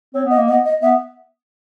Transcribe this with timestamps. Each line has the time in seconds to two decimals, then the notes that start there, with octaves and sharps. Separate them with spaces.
0.14 C4 C#5
0.26 B3
0.31 D#5
0.37 A#3
0.48 B3 D#5
0.65 D#5
0.82 B3 E5